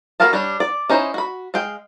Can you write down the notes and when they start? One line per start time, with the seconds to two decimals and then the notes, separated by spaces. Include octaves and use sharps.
0.20 B3 F#4 A#4 F5 A5
0.33 G3 D4 C#5
0.60 D5
0.90 C#4 D#4 E4 C5
1.14 F#4 B5
1.54 G#3 F5 G5